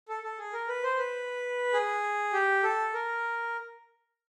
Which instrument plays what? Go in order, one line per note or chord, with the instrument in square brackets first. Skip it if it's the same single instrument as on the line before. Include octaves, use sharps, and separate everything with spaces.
[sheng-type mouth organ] A4
A4
G#4
A#4
B4
C5
B4
G#4
G4
A4
A#4